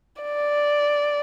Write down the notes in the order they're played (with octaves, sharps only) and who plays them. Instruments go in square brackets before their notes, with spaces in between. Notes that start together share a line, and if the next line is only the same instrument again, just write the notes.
[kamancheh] D5